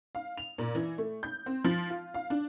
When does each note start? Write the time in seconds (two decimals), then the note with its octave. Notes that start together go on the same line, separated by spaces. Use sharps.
0.15 F5
0.38 F7
0.58 A#2
0.75 E3
0.98 A3
1.23 G6
1.46 C4
1.64 F3
1.90 F4
2.14 F5
2.30 D4